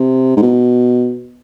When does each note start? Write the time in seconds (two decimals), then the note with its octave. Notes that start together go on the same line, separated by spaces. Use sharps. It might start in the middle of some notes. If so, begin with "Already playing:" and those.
Already playing: C3
0.37 G#2
0.42 B2